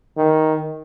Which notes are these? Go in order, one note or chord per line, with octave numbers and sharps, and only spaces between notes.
D#3